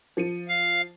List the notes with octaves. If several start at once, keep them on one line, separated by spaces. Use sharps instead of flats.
F3 C#7 D#7
F5